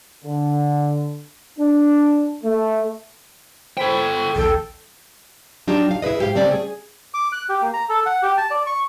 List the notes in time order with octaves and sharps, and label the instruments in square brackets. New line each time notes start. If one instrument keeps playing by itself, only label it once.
[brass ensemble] D3
D4
A3
[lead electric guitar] A4 G5 [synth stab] C5 B5
[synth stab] A#1 D#2 G5 [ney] A4
[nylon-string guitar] F#3 D4 D#4 F4 G4
F5
E4 G#4 B4 D#5
G#2 G4 F5
C#3 G3 A3 C4 C#4 D5
G#4
[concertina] D6
F#6
G4
A#3
A#5
A4
F#5
G4
A5
D5
C#6